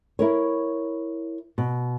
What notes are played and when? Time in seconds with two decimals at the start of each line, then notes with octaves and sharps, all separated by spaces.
0.19 E4 A#4 C#5
1.58 B2